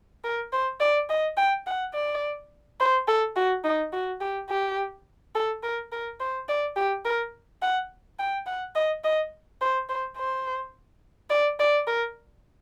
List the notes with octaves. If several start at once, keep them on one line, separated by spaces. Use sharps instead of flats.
A#4
C5
D5
D#5
G5
F#5
D5
C5
A4
F#4
D#4
F#4
G4
G4
A4
A#4
A#4
C5
D5
G4
A#4
F#5
G5
F#5
D#5
D#5
C5
C5
C5
D5
D5
A#4